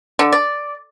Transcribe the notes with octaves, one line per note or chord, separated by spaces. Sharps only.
D3
D5